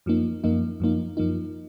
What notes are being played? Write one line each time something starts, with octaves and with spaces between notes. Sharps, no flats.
F#2 F3 A#3 D#4
F#2 F3 A#3 D#4
F#2 F3 A#3 D#4
F#2 F3 A#3 D#4